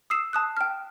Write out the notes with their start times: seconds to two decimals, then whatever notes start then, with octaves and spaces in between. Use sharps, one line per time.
0.10 D#6 E6 C7 E7
0.33 A5 D#6 F#6
0.57 G5 F6